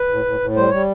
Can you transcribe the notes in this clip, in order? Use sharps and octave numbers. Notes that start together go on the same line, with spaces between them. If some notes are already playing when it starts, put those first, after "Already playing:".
Already playing: B4
A2
A2
A2
G3 C5
G3 C#5